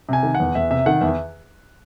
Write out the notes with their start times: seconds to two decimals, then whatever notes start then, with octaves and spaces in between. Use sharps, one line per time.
0.09 C3 G#5
0.23 D#3
0.35 F#5
0.40 E2
0.55 E2 E5
0.70 C3 E5
0.86 D#3 F#5
1.01 E2 E5